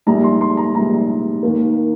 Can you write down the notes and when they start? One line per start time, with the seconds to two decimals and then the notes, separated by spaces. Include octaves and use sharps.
0.07 A#1 G#2 G3 A#5
0.24 C6
0.41 C6
0.57 A#5
0.75 A#1 G#2 G3 A#5
1.43 D#2 D#3 A#3